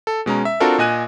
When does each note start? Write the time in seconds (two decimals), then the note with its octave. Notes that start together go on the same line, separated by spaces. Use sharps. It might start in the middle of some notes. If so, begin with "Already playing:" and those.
0.07 A4
0.26 B2 G#3 C#4 A#5
0.45 E5
0.60 C4 D4 F4 F#4 A4 A#4
0.78 A#2 D#5 G#5 F#6 D#7